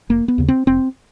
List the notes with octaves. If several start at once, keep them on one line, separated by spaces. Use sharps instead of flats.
F1 A#3
B3
D#2 C#3
C4
F1 C4